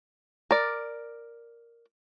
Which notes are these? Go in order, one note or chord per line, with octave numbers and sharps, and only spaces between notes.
A#4 D5